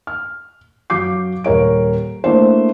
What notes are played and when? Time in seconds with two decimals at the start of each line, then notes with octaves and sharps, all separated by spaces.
0.07 F6
0.90 F#2 F#4 F5 D6 G6 C7
1.44 D#1 A#4 C#5 D7
2.24 A3 A#3 D4 E4 C5